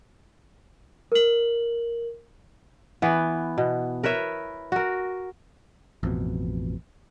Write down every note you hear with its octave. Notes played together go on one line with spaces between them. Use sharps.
A#4 F#7
E3 B3
B2
A#4 B4 C#5 E5
F#4 A#4
A1 F2 B2